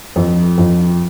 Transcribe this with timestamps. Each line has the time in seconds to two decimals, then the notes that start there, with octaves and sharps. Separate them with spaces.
0.16 F2
0.58 F2